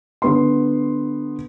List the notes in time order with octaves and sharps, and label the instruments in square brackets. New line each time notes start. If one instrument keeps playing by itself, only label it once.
[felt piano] D3 B3 C6